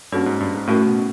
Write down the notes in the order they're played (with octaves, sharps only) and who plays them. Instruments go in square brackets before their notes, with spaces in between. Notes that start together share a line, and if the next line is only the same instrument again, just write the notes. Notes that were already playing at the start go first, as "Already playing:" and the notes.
[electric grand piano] G2 [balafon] A#3 C#4 F#4 A4 C#5
[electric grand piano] G#2
G2
G#2
[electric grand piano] A2 [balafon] A3 C#4 F#4 A#4
[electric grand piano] B2